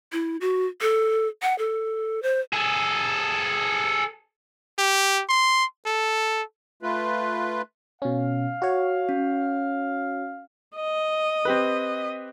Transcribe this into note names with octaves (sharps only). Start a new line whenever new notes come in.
E4
F#4
A4
F#5
A4
C5
G#4 A4
G4
C6
A4
A3 F4 B4
B2 C#4 F5
F#4 C#5
C#4
D#5
C4 G4 B4